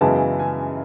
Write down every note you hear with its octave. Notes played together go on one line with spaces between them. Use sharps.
F#2 C#3 E3 G#3 B3 A5
G#5